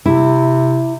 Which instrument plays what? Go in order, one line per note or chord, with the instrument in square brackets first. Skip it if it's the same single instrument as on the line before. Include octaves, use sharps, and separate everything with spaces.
[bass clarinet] C3 [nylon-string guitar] E4